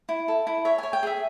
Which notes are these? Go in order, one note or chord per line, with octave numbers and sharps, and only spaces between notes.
E4
A4
E4
C#5 E5
C#5 G#5
G5
G#4 E5